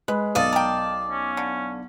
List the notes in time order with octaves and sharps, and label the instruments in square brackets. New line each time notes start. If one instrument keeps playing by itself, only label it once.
[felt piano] G#3 [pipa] B4
[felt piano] B1 F5 [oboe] A4 [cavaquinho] D5 D#5
[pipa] A#4 G5 [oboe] A5
[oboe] C#4
[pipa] D3